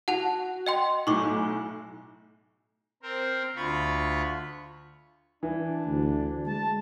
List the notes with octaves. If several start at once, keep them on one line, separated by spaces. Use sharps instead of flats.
F#4 F#5 A5 F7
D#5 G5 C6
B1 A2 G#5 C#6 D6
C4 A#4 C5
D2 F4 B5 C#6
E3 D4
D2
G#3 A5